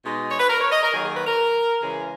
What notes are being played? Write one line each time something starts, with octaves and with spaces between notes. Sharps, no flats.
B2 G#3 D#4
C#5
B4
A#4
C#5
D#5
A#4
D#3 F#3 A#3 G#4
G#4
B4
A#4
C#3 E3 G#3 C#4 G#4